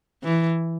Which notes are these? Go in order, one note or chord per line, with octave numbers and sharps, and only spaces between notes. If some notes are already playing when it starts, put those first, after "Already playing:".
E3